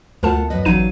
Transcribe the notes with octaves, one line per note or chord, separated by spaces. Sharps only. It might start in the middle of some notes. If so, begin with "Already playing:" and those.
D2 A3 F4 A#4 F#5 A5
F#2 B4 D#5
A1 E3 F#3 D#4 F5 D#7